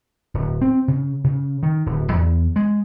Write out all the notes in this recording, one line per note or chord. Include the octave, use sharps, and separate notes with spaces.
D1
C4
C#3
C#3
D#3
D1
E2
G#3